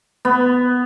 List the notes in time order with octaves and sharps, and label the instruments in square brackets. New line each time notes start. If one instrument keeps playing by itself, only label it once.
[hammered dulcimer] B3